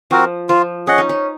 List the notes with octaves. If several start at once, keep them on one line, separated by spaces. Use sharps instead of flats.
F3 C4 F#4 A#4
F3 F4
C#4 G#4 D#5 F#5
D#4
C#4